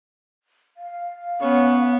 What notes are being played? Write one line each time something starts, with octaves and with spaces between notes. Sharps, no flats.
F5
B3 C#4 C#5